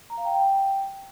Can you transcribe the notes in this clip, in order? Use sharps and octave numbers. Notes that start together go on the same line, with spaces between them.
A#5
F5
G5